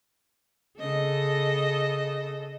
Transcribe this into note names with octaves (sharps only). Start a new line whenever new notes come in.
C#3 A4 D#5